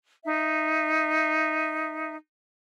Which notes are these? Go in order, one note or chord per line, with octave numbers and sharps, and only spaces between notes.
D#4 E5